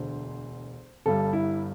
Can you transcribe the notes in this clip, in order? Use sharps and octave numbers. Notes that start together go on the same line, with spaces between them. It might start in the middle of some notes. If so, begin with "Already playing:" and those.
Already playing: E1 D2 D3 C5
G1 G2 G3 A4
E4